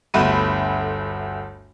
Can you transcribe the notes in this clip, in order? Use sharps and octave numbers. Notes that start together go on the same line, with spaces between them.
G1 D2 A3 B5 D#7